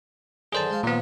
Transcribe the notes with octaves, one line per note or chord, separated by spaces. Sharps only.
F#2 D3 D#3 G#4 C5 A5
G#3 F5
A#2 D#3 F3 B3